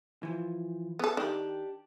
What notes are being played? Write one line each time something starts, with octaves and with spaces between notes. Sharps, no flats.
E3 F3
B3 A4
D#3 D4 G4